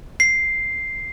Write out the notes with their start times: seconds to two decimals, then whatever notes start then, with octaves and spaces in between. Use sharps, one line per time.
0.20 C7